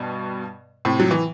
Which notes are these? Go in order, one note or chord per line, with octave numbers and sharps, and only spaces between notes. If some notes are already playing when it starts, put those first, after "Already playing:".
Already playing: G2 B2
A2 C3
F#3
E3